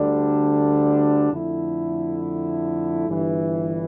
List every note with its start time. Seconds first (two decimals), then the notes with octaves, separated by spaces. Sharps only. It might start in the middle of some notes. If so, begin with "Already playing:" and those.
Already playing: D2 D3 G3 D4
1.31 F2 D3 A3 E4
3.08 G1 G2 E3